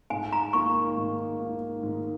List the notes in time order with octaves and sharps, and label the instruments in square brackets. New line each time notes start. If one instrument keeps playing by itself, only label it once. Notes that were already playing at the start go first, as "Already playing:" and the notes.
[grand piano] G#2 [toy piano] G#5
[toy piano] A#5
[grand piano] D#3 A#3 [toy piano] C#6
[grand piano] G#2
D#3 A#3
G#2